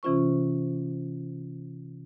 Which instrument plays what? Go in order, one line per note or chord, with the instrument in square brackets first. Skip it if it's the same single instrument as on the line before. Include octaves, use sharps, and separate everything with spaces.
[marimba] C3 E3 C#4 F4 C5 C#6